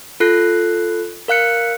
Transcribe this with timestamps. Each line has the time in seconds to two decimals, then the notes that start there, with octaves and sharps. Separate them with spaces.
0.20 F4 A4 F#6 C7
1.28 A#4 F5 F#6 C#7